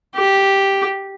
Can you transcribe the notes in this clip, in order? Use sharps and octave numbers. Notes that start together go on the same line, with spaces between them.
G4